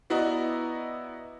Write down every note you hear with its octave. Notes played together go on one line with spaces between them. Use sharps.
B3 E4 F#4 D5 D#5 A#5